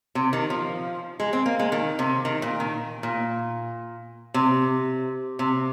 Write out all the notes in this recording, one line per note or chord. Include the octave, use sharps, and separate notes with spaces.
C3
D#3
F3
G#3
C4
A#3
G#3
D#3
C3
D#3
A#2
D#3
A#2
C3
C3